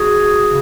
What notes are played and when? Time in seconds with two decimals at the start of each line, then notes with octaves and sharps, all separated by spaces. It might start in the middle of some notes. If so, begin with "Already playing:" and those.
Already playing: F#4 G#4
0.46 C#3